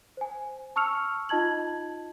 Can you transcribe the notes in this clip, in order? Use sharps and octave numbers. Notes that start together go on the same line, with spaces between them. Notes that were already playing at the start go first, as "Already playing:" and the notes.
C5 G#5
A5 C#6 E6 F6 C#7 F7
D#4 F4 D#5 A5 G#6 F#7